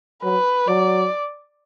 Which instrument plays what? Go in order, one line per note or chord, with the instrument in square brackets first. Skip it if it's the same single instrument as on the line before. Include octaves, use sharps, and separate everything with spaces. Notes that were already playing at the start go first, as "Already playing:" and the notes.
[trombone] F#3 [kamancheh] B4
[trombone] F#3 [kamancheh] D5